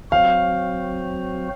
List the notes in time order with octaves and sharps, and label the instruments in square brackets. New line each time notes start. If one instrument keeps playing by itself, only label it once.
[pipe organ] F#3 C4 F#4 C5 [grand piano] F5